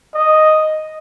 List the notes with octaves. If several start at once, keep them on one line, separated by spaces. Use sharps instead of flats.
D#5